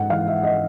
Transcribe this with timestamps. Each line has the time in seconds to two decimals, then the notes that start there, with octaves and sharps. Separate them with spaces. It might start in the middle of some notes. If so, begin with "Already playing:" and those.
Already playing: G#2 F#5
0.10 E3 F5
0.27 E5
0.43 D#5